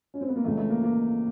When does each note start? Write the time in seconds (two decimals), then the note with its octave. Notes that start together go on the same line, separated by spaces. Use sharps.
0.14 C#4
0.21 C4
0.28 B3
0.36 A#3
0.44 C#2 C#3 E3 A3
0.57 A3
0.70 A#3
0.83 A#3